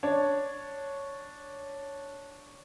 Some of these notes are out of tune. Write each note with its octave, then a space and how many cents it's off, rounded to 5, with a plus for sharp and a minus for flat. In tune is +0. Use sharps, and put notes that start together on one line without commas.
D4 -5 C#5 +0